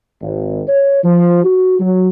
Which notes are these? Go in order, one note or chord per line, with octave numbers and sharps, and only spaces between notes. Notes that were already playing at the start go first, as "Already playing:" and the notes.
G#1
C#5
F3
F#4
F#3